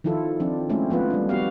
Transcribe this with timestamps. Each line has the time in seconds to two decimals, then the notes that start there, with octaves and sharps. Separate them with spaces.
0.04 D#3 F3 E4 F4 A4
0.40 F3 C4 D4
0.69 G#3 A3 C4 C#4 E4
0.90 F3 B3 F4 B4
1.10 G3 D4
1.29 B3 F#4 G4 F5